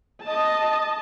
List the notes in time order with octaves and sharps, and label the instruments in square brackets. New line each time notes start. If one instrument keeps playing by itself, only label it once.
[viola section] D#5 A5